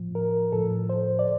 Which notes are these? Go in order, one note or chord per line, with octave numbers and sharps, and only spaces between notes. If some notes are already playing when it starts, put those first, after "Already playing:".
Already playing: A2 F3
A#4
A2 F3 A4
C5
D5